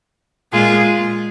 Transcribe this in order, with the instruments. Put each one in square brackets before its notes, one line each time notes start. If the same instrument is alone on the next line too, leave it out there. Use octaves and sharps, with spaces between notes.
[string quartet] A#2 G#3 F4 G#4